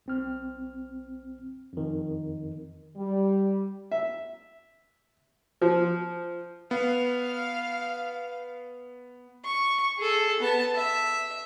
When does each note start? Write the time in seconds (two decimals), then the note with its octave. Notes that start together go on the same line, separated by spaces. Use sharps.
0.06 B1 C4 F6
1.73 F2 D#3
2.95 G3
3.91 E5
5.61 F3
6.71 B3 F5
9.45 C#6
9.98 G#4 A4
10.40 B3 A5
10.75 E5